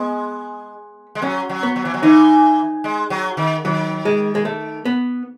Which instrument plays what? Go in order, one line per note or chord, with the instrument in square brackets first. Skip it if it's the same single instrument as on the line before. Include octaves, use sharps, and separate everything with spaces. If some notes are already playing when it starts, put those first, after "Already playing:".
Already playing: [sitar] G#3 [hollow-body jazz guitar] B3
[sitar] G#3
[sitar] F#3 [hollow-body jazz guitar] C#4
[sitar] F#3
[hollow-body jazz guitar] B3
[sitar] F#3
E3
F#3
[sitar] E3 [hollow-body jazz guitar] D#4
[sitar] G#3
F#3
D#3
[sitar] D#3 [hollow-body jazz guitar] F#3
[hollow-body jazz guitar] G#3
G#3
A3
B3